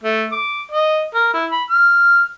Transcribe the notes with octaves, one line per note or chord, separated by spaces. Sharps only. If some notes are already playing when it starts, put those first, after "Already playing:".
A3
D6
D#5
A#4
E4
B5
F6